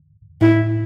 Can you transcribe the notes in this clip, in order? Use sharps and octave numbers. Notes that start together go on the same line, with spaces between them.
A2 E4